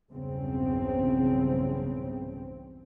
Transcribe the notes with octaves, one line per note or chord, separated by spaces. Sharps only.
B1 E2 G2 C#3 C4